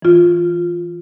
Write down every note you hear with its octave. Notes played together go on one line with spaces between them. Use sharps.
E3 F4